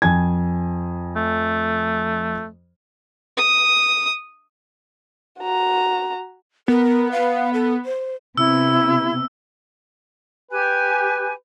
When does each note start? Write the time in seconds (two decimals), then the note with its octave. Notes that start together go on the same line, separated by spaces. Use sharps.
0.02 F2 G#5 G#6
1.16 A3
3.37 D#6
5.40 F#4 A#5
6.68 B3 A#4
7.12 F5
7.54 A4
7.85 C5
8.37 C3 B3 E4 E6
10.51 G4 B4 G#5